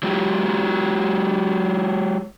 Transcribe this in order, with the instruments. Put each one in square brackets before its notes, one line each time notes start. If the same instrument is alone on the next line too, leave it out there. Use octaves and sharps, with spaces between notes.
[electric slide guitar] F#3 G#3 F4 G4